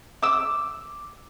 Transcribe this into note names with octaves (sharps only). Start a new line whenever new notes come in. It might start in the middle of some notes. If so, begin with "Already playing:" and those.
D6 E6